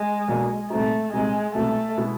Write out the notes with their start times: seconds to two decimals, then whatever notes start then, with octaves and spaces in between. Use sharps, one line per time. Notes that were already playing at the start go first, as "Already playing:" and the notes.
Already playing: G#3
0.28 B1 B2 F#3 A#3 D4
0.70 C2 A#2 G3 A3 C4 D#4
1.13 C2 A#2 G3 G#3 C4 D#4
1.54 C2 B2 G#3 A3 B3 E4
1.97 B2 G#3 B3 E4